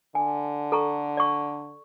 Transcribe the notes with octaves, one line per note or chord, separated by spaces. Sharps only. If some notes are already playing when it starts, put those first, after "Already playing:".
D3 G#5
A4 A#5 C#6
D5 C#6